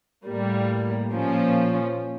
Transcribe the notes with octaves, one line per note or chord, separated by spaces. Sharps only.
A2 G3 A#3
A#2 F3 C#4